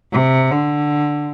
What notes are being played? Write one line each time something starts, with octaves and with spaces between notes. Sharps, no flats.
C3
D3